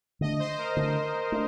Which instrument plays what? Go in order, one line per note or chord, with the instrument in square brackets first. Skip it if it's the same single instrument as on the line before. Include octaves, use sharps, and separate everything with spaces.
[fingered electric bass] D3 A3 D4 [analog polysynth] D#5
[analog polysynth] C5
A#4
[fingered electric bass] D3 A3 D4
A3 D4